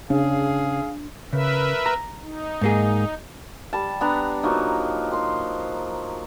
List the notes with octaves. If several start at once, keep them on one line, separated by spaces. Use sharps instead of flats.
C#3 D4 G#4 F5
C#3 A#4 B4 E5
A#5
D#4
G#2 A#3 G#4
G3 A5
B3 D4 A#5
F3 F#3 A#3 D#4
C5 C6